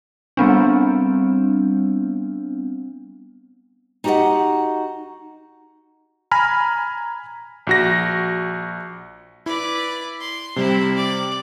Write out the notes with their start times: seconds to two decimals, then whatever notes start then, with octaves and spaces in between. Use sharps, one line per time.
0.37 G3 B3 C4 D4
4.04 D#4 F#4 G4 B4 D#5 F#5
6.31 G#5 A#5 B5 F6
7.67 A#1 F#4 A#6
9.46 E4 B4 D5
10.20 C6
10.56 C3 G3 C4 E4
10.96 D5